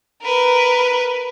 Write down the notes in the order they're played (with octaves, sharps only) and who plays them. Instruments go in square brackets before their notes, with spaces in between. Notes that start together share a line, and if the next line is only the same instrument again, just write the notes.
[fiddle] A#4 B4